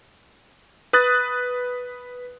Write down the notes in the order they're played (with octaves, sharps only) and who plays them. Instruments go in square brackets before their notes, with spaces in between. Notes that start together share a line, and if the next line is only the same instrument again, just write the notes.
[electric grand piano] B4 D#6 F#6 A6